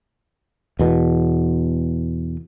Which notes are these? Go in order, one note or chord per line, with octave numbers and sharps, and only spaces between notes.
E2 B2